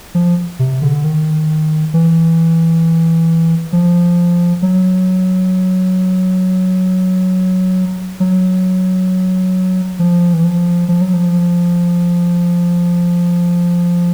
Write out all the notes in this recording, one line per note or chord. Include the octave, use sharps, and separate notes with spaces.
F3
C3
D3
D#3
E3
F3
F#3
F#3
F3
E3
F3
F3
F#3
F3